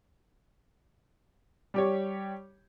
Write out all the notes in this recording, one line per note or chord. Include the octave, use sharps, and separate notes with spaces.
G3 G4 C#5